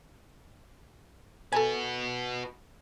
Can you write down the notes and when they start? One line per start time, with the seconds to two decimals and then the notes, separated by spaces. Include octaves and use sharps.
1.52 F#4 A4 B4 G#5